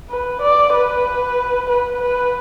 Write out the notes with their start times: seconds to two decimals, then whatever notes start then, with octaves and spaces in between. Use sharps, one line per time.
0.10 B4
0.42 D5
0.74 B4
1.69 B4
2.01 B4